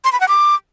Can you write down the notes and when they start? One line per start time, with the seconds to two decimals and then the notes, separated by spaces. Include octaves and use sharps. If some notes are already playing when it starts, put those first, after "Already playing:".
0.05 C6
0.12 B5
0.20 F#5
0.28 D6